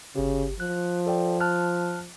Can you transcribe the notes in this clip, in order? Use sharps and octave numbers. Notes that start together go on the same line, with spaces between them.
G1 C#3 G4
F3 F#6
A4 D5 G5
A5 F6 F#6